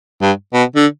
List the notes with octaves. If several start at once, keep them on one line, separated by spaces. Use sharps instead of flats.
G2
B2
D3